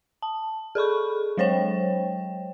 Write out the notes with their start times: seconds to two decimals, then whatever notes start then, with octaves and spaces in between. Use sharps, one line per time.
0.22 A5
0.75 G#4 A4 B5 C#6
1.37 F#3 G#3 C5 C#5 G5